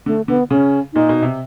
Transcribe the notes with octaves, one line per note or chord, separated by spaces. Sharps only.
D3 A3
D3 B3
C#3 C#4
A#2 D#4
B2
C3